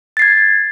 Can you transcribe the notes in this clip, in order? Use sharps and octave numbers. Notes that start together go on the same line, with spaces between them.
G#6 A6 C7